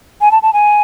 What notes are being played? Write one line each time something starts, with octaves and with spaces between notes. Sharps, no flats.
G#5
A5
A5
G#5